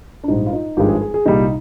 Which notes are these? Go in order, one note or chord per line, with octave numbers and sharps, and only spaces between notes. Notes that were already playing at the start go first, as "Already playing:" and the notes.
D4
A#1 G#2 G3 D#4
F4
D#4
G#1 G2 F3 G#3 G4
G#4
G#4
G#4
C2 A#2 G3 D#4